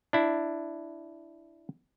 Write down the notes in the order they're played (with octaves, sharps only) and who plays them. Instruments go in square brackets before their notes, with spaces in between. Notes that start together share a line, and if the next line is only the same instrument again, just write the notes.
[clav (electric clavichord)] D4 E4